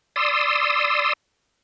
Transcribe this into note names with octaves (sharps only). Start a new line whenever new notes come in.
D5 C6 D#6 E6